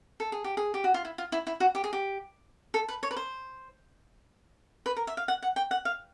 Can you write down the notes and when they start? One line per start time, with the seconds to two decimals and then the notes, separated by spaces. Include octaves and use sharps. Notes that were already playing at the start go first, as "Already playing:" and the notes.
0.20 A4
0.32 G#4
0.44 G4
0.57 G#4
0.74 G4
0.84 F#4
0.94 F4
1.05 E4
1.18 F4
1.32 E4
1.47 E4
1.60 F#4
1.75 G4
1.84 G#4
1.93 G4
2.74 A4
2.89 B4
3.03 C#5
3.11 B4
3.17 C5
4.86 B4
4.97 A#4
5.07 E5
5.17 F5
5.28 F#5
5.42 F#5
5.56 G5
5.71 F#5
5.85 F5